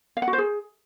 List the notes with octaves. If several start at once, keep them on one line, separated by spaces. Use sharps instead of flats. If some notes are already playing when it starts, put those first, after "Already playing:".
F5
F#5
F#4
C5
G#4